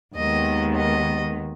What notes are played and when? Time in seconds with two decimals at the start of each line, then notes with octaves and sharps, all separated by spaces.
0.15 D#2 D#3 G#3 B3 D#5
0.76 D#5